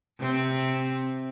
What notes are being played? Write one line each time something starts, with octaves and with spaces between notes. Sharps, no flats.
C3 C4